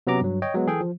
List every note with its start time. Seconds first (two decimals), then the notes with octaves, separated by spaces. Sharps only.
0.07 C3 F#3 B3 C#4 A#5 D6
0.21 G2 F#3
0.42 C#5 D#5 G5
0.54 F#3 G#3 B3
0.67 E3 G#4 A4 G5
0.81 F3